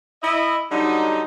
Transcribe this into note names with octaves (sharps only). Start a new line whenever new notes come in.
E4 D#5
D3 F#3 G3 D#4